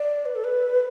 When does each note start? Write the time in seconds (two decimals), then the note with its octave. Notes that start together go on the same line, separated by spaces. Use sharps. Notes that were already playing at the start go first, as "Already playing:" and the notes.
Already playing: D5
0.26 B4
0.35 A4
0.44 B4